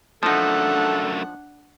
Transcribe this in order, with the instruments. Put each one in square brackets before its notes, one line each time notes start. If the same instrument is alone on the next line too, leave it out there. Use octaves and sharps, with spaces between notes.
[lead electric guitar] F#2 A3 [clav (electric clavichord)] F3 D#4 [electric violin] D4 F#5 [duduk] A4